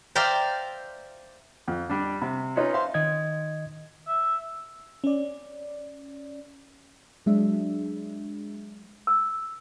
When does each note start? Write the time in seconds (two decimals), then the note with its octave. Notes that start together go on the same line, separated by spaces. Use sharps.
0.15 C5 D5 E5 F5 G5 A#5
1.68 F2
1.90 G3 D4
2.22 C3
2.56 C#4 D#4 F4 B4 C#5
2.73 C5 E5 F5 C6
2.94 D#3 D#5 G#6
4.07 E5
5.04 C#4 D5
7.26 F#3 G#3 D4 E5
9.07 E6